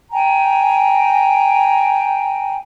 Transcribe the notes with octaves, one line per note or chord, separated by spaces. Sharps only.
G5 G#5 A#5